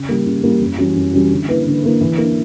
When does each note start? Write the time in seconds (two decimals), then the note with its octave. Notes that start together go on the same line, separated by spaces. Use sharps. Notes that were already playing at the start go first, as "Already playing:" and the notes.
Already playing: C#3
0.09 G3 A#3
0.26 C#3
0.43 G3 A#3
0.61 F#2
0.78 E3 G3 C#4 F#4
0.95 F#2
1.13 E3 G3 C#4 F#4
1.31 D3
1.48 A#3 E4 B4
1.66 D3
1.83 A#3 E4 B4
2.01 E3
2.18 A#3 D4